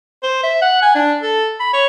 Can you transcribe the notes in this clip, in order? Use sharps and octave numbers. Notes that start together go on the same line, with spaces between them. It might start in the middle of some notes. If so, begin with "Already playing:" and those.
C5
E5
F#5
G#5
D4
A4
B5
C#5